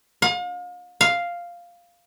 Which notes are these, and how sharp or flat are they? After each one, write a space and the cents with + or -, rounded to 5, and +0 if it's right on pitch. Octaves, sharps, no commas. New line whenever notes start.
F5 +40
F5 +0